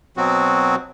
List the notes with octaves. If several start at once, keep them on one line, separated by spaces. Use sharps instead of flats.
B2 F#3 C4 F#4